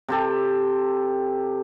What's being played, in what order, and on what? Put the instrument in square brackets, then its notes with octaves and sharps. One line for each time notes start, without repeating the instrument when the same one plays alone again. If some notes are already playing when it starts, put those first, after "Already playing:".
[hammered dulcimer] C3 G4 A4